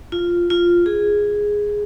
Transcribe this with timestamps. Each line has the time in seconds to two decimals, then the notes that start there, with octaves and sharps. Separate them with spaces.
0.12 F4
0.50 F4
0.86 G#4